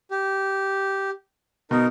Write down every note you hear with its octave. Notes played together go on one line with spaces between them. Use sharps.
G4
B2 D#4 A#4